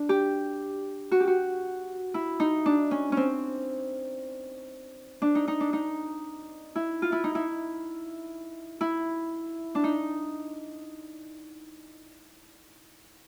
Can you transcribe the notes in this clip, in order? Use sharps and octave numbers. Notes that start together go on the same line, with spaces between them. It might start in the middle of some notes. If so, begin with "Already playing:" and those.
Already playing: D4
G4
F#4
G4
F#4
E4
D#4
D4
C#4
C4 C#4
D4
D#4
D#4
D4
D#4
E4
F4
E4
D#4
E4
E4
D4
D#4